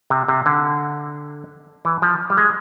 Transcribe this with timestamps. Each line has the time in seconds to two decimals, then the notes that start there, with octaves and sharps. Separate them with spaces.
0.10 C3
0.28 C3
0.46 D3
1.85 E3
2.02 F3
2.30 G3
2.37 G#3